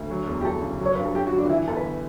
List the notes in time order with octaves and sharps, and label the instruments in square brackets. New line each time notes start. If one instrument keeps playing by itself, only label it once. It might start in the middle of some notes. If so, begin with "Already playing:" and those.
Already playing: [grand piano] D2
F#3
E2
[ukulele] G4
[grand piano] E2 [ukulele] A4
[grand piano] C#3
F#3
[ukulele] C#5
[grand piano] G2 [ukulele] B4
[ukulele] A4
[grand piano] C#4 [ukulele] G4
[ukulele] F#4
[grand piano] D3
[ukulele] D4
F#4
[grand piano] E3 [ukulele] E4
[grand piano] G1 [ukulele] A4
[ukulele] B4